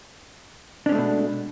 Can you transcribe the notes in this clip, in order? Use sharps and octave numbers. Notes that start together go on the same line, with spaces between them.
B2 G#3 A3 C#4 D4